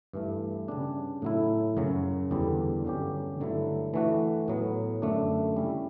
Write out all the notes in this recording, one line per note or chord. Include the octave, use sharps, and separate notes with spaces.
G2 E3 A3
C#3 G3 D4
A2 F#3 A3 E4
F#2 C#3 F#3
E2 D3 G3
G2 D3 F#3 C#4 G4
G2 D3 F#3 A3 E4
E3 A3 D4 F#4
A2 F#3 B3
F#2 D3 A3 D4
C#3 G3 C#4 E4